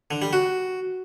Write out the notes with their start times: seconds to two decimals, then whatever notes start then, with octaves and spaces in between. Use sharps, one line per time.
0.11 D3
0.22 G3
0.33 F#4